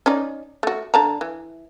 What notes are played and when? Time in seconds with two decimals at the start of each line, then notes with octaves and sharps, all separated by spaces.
0.06 C#4 D#4 D5
0.63 A3 F#4
0.94 D3 A5 A#5
1.21 E3